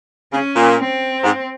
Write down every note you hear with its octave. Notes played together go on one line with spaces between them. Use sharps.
C#3 C#4
A#2
C4
G#2